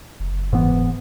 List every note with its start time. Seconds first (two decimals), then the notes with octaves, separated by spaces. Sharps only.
0.20 F#1
0.53 G#2 E3 B3